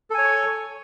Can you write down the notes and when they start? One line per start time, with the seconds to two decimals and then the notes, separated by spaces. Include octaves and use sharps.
0.10 A4
0.14 G#5
0.18 C#5
0.22 C#6